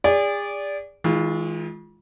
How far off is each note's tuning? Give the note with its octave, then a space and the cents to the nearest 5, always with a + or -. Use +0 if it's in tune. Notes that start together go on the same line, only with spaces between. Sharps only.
G#4 -35 D5 -15
E3 -45 G#3 +0 F4 +0